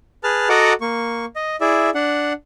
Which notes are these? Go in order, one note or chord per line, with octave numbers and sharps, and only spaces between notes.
G#4 B4 A5 F6
F#4 A4 D#5 F#5 A#5 D6
A#3 C#6
D#5
E4 G#4 D5 E5
D4 F#5